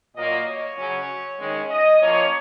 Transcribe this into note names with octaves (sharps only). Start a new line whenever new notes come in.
A#2 F#3 A#3 D#5
C#5
C#3 F#3 C#4
D#3 G#3 C#4
D#5
F3 A#3 C#4 C#5